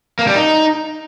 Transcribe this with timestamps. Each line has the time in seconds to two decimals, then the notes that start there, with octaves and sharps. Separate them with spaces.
0.19 A#3
0.27 G3
0.35 D#4